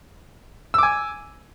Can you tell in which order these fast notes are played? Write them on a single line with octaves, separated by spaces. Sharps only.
E6 D6 G#5